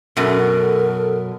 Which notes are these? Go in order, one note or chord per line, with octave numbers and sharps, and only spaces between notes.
F#2 B2 A4 A#4